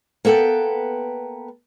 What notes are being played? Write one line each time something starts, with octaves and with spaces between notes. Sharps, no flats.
A#3 B3 A4 B4 G5